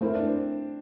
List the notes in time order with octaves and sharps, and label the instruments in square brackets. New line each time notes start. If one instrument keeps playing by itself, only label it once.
[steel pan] A3 E4 A#4 [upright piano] C4
[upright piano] D4
C4